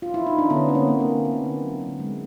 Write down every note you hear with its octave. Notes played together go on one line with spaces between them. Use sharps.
F4
E4
D#4
D4
D3 B3 C#4
D3 C#4
A#3 C4
A#3
A#3
D3
D3 B3
D3
F#3
D3
G#3